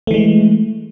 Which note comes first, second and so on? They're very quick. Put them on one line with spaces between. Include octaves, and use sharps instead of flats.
A3 E3 G#3